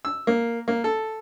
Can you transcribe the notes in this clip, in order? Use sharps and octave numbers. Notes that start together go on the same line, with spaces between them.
E6
A#3
A#3
A4